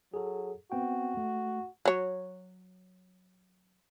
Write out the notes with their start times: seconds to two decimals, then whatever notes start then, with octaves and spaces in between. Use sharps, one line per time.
0.14 F#3 G#4 A4
0.72 B3 C4 F#4 G5
1.17 A3
1.85 F#3 C#5